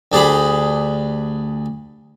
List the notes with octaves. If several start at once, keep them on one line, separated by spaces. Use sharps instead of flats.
D2 D4 G4 G#4 B5